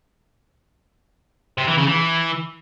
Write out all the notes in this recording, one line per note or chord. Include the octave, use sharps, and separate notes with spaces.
C3
E3
C#3
E3